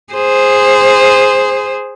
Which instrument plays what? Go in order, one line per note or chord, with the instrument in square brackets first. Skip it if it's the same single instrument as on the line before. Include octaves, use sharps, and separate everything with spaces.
[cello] G#4 C5